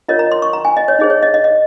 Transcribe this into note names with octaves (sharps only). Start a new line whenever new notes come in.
F4 A#4 C#5 D#5
A#5
C6
C#6
A#5
G#5
D#5
C#5
D#4 G#4 C5 D#5
C#5
D#5
D#5
D#5